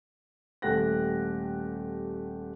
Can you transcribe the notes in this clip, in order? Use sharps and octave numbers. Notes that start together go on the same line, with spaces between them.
D#1 A3 G4 F#5 F#6 A#6